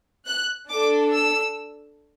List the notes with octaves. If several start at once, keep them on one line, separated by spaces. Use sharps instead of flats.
F#6
D4 A4 D6
E6